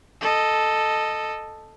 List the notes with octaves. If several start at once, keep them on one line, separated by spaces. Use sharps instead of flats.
A4 D#5